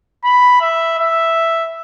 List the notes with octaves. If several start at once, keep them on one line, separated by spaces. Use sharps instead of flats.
B5
E5
E5